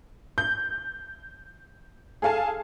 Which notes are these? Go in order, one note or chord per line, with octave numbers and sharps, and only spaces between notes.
G6
G#4 A4 F5 G#5 A5